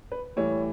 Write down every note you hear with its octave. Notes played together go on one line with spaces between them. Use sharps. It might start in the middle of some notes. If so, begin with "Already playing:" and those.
B4
A2 E3 G3 C#5